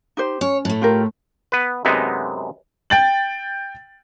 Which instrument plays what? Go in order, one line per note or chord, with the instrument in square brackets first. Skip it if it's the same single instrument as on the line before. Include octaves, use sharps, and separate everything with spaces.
[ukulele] D#4 G4 C5
[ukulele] C#4 [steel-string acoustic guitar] C#5
[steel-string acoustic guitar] A2 A3
[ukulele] F4 G4 A#4
[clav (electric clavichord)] B3 B4
F#2 C3 G#3 B3 D#4
[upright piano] G5 A6 F#7